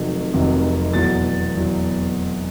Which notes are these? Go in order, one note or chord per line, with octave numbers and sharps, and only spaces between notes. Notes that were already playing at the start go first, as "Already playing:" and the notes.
Already playing: F1 F2 C3 D#3 F#3
F1 F2 C3 D#3 F#3
E2 B2 F#3 A6
E2 B2 F#3